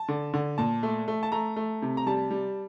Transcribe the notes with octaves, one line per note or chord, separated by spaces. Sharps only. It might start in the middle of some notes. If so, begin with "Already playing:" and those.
Already playing: A5
D3
D3
A#2 A5
A3
A3
A5
A3 A#5
A3
C3
A#5
G3 A5
G3